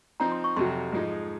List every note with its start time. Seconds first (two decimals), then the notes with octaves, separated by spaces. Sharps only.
0.20 F3 C4 D#4 A#5
0.32 C6
0.44 C#6
0.57 F2 C3 F#3 C6
0.92 G#2 F3 G#3 D#4